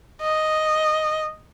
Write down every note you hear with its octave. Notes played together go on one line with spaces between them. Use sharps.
D#5